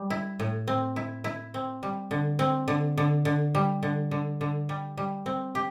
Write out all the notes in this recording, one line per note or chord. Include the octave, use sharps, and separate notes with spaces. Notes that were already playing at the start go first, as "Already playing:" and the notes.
Already playing: G3
E4
A2
C4
E4
E4
C4
G3
D3
C4
D3
D3
D3
G3
D3
D3
D3
G3
G3
C4
G4